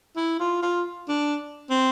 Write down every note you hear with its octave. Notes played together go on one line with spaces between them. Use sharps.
E4
F4
F4
D4
C4